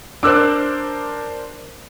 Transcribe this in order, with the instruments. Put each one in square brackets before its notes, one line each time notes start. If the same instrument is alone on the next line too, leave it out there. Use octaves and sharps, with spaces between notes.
[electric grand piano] D4 A#4 C5 [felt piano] D6 E6 F#6